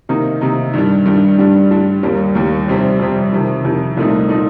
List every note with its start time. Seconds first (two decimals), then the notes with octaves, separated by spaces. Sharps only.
0.09 C3 D#3 A#3 D#4
0.41 C3 D#3 A#3 D#4
0.74 G2 D#3 G3 D4
1.06 G2 D#3 G3 D4
1.38 G2 D3 G3 D4
1.71 G2 D3 G3 D4
2.03 D#2 D#3 G3 A#3
2.35 D#2 D#3 G3 A#3
2.68 F2 C3 G3 C4
2.99 F2 C3 G3 C4
3.32 F2 C3 D#3
3.65 F2 C3 D#3
3.97 C2 A#2 A3 D#4
4.29 A#2 A3 D#4